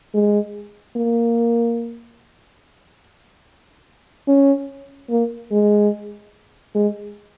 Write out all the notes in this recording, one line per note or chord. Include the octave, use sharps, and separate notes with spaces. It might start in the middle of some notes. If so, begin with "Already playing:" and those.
G#3
A#3
C#4
A#3
G#3
G#3